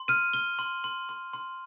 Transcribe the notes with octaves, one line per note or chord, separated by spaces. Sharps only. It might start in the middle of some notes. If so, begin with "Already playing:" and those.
Already playing: C6
F6 D#7
F6 G7
C6
C6
C6
C6